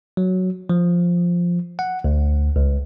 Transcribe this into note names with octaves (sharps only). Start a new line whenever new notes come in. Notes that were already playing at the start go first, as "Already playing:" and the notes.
F#3
F3
F#5
D2
C#2